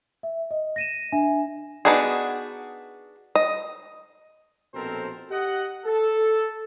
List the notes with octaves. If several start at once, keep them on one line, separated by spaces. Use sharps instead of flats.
E5
D#5
A#6 D#7 E7
D4 E5 G#5
B3 D4 D#4 F#4 G#4
D#5
A#1 B2 C4 A4 A#4 C5
G4 D#5 F#5
A4